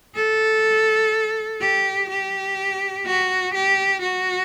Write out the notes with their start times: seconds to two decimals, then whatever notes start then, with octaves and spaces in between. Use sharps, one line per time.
0.15 A4
1.61 G4
2.10 G4
3.06 F#4
3.54 G4
4.02 F#4